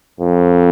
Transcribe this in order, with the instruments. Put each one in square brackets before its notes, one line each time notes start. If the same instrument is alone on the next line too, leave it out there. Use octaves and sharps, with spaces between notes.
[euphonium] F2